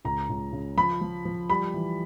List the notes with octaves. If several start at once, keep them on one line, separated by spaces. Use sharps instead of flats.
C#2 A#5
C#2
C#3
F3 B5
F3
F3
G3 B5
E3